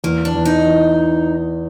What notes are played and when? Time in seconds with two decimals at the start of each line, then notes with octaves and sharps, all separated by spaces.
0.04 E2 A#3
0.25 D4
0.35 E2
0.45 D#4
0.67 E3